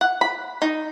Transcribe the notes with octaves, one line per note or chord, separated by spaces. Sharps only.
F#5
B5
D#4